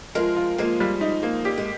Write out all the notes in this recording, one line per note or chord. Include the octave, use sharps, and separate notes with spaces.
F3 G#3 A#4
F4
F3 G#3 A#3
G3
D#4
A#3
G3 G4
G#3